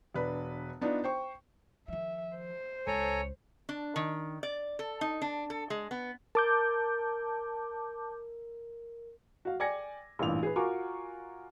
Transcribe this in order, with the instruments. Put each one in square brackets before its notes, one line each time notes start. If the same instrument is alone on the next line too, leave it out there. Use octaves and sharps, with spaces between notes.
[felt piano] E1 D4 B4
B3 D4 D#4 F4
C5 G5 C#6
[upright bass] D#3 F3 [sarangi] E5
[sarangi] C5
[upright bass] C#2 [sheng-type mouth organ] A4 G#5 A#5 [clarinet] C#5
[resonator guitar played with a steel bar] D4
D#3
D5
A4
D#4
D4
A4
G#3
B3
[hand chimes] A#4 [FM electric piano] A5 D6 G6
[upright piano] F#4 F5
D5 G5 G#5 G#6 A#6 C#7
A1 G2 A#2 E3 F7
G#4 B4
F4 F#4 A#4 G#5 C#6 D6